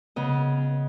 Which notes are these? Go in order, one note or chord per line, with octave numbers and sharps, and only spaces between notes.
C#3 B3 D#5